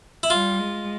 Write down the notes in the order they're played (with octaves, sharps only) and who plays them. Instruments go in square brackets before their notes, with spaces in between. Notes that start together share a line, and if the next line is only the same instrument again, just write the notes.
[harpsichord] E4
[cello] G3 [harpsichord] F4
[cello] G#3